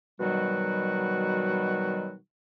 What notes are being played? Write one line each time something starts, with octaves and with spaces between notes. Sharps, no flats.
B2 D#3 F#3 G3 F#4